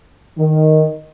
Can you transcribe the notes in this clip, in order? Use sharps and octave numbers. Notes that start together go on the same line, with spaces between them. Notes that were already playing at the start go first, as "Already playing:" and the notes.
D#3